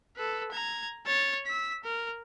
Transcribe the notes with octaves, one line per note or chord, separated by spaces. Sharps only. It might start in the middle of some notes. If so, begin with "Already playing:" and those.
A4 B4
A#5 G#6
C#5 A6
E6 B6
A#4